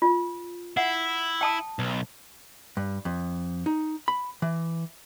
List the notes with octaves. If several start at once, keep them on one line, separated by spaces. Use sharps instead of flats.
F4
E4 F#5
G5 A5 D#6
B1
G2
F2
D#4
B5
E3